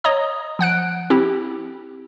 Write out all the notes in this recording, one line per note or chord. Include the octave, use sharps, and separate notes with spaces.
C#5 D#5 A#5 D#6
F3 F#5 F#6 D7
C4 E4 G4